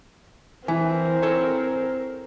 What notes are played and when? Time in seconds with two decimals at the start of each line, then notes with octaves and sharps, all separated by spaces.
0.68 E3 C4 E4 A#4 G#5
1.23 A4 C#5